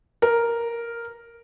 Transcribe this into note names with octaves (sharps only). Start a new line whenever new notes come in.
A#4